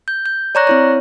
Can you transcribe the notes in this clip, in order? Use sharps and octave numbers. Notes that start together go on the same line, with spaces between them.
G6
G6
C#5 D5 A#5 C#6 F#6 A#6
C4 E4 C#5